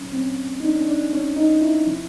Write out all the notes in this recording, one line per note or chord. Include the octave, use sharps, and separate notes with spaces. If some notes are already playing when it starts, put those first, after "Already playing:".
Already playing: C2 A#2 F#3 C#4
C4
C#4
D#4
D4
C#4
D4
C#4
D#4
E4
C3 F3